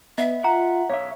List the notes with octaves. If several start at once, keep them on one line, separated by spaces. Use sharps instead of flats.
B3 D#5 E5
F4 F#5 A#5
B1 C#5 E5 F5